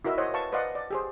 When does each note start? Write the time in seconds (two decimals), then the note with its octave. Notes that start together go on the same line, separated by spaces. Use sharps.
0.05 E4 F#4 A#4 D#5 E5
0.18 C5 C#5 D#5 F#5
0.34 B4 F5 A5 C#6
0.52 B4 C5 D5 D#5 F5 F#5
0.75 D5
0.90 G4 G#4 C5